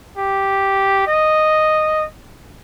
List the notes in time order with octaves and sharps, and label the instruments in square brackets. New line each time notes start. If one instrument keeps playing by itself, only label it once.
[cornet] G4
D#5